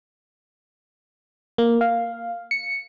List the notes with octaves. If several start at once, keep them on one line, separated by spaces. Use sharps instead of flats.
A#3
F5
C#7